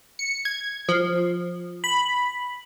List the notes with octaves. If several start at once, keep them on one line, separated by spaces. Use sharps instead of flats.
C#7
G#6
F3
B5